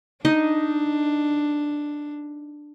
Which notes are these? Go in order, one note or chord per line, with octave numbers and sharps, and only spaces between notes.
D4 D#4 D#5